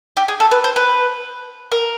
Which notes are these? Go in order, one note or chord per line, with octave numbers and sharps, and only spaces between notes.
G4
G#4
A4
B4
C5
B4
A#4